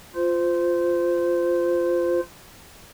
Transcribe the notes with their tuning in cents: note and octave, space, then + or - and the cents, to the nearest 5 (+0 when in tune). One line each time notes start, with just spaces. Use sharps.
F4 +0 C5 -20